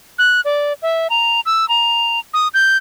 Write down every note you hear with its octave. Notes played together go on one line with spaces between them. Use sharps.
F#6
D5
E5
A#5
E6
A#5
D#6
G6